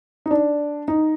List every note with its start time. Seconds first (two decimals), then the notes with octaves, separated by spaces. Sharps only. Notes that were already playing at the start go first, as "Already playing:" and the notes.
0.26 D#4
0.31 D4
0.88 D#4